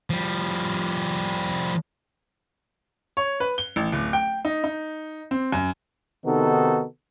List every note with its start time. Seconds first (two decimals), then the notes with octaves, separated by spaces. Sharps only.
0.10 F3 G3
3.17 C#5
3.40 B4
3.58 G7
3.76 A1
3.92 D1
4.13 G5
4.45 D#4
4.64 D#4
5.31 C4
5.52 F#2
6.25 C3 D#3 B3 D#4 F#4 A4